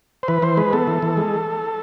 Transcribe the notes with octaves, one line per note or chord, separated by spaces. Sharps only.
C5
E3 B4
E3 C5
G#3 B4
B3 A4
E3
E3
G#3